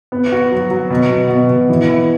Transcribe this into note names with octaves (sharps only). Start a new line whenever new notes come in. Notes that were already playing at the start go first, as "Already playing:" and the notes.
B3
F#4
F#3
F#3
B2
B2
B2
B2
E3
E4